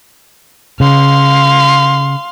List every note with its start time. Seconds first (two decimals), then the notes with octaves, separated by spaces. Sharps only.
0.80 C#3 F5 C6